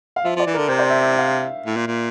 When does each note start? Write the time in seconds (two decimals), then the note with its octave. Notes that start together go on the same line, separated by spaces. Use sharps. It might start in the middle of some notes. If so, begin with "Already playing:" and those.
0.16 F5
0.25 F3 E5
0.36 F3 D5
0.47 E3
0.54 A#4
0.58 D3
0.68 C3 C5
0.79 D5
0.90 E5
1.01 E5
1.12 E5
1.19 F5
1.27 E5
1.66 A2
1.76 A#2
1.87 A#2